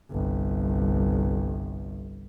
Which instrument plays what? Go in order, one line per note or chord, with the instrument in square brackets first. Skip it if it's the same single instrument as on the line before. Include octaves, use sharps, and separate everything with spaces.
[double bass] G1 C2